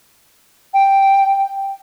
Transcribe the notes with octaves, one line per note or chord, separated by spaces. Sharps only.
G5